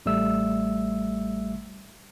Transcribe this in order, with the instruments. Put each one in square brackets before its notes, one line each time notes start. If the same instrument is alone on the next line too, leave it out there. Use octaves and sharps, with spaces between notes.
[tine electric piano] A1 G3 A3 E5 E6